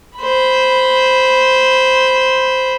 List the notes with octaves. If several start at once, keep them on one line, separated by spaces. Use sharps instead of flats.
C5 B5